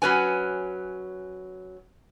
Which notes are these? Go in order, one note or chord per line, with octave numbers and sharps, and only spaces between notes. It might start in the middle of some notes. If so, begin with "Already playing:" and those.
F#3 C#4 B4 G#5